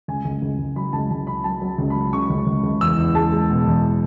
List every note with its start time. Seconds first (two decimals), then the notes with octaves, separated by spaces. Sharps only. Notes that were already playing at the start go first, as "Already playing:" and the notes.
0.08 C#2 G#5
0.25 C#2
0.42 C#2
0.59 C#2
0.76 F#3 B5
0.93 C#2 A5
1.10 C#2 A5
1.27 C#3 B5
1.44 F#3 A5
1.62 F#3
1.78 C#2
1.90 B5
1.96 F#3
2.13 C#3 C#6
2.30 C#2
2.47 C#2
2.64 C#2
2.81 E2 E6
2.98 E2
3.15 G#3 A5
3.32 G#3
3.50 B2
3.66 E2